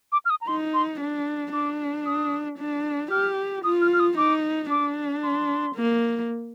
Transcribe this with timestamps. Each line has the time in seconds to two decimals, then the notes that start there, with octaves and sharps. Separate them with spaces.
0.12 D6
0.25 F6
0.30 D#6
0.41 A#5
0.47 D#4 C6
0.74 C6
1.00 D4
1.53 D4 D6
2.06 D#6
2.58 D4
3.11 G4 F6
3.64 F4 D#6
3.81 F6
3.93 F6
3.99 D#6
4.17 D#4 D6
4.70 D4 D6
5.23 C6
5.75 A#3